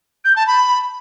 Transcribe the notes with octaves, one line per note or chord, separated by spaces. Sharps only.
G6
A5
B5